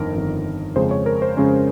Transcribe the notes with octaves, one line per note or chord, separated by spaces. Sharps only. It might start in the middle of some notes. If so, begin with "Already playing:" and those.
Already playing: G1 F2 D#3 A#4
G1 F2 D#3
F2 C#3 G#3 C#4 C5
C#5
A#4
C5
F2 C#3 G#3 C#4 C#5